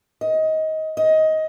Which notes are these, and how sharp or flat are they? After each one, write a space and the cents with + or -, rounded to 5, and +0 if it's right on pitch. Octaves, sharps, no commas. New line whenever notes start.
D#5 +20
D#5 +15